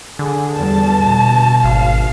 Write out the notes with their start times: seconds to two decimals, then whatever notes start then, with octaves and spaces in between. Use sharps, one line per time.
0.19 D3 G#4
0.56 E2 G3 A5
1.02 B2
1.64 G#1 F5